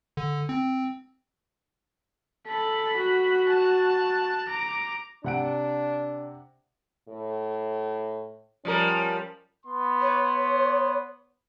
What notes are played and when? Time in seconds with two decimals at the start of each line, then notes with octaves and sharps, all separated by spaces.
0.17 D3
0.49 C4
2.48 A4 B5
2.98 F#4
3.49 A5 F#6
4.49 A#5 D6
5.24 C3 D4 F#5 D7
7.09 A2
8.65 F3 G3 C#4 A#4
9.66 B3 C6
10.01 C#5